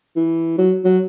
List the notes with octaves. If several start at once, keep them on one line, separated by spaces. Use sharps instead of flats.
E3
F#3
F#3